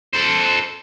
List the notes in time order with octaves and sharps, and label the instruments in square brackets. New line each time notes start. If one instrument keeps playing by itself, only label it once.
[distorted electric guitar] A4 C5